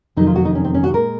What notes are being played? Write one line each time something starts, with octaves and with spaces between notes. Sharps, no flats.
F2 C3 D#3 F#3 D#4
F4
F#4
D#4
C#4
C4
C#4
F#4
A#2 G#3 A#4